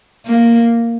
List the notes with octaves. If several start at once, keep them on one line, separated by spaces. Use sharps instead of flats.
A#3